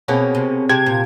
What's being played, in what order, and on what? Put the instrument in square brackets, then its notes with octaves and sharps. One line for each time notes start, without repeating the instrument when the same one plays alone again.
[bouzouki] B2 A#3 C#4 [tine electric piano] C4 G#4 C#5
[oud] C3
[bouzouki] C3 [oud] G#3 [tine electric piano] G4 G5 A5 [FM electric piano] G#6
[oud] A#2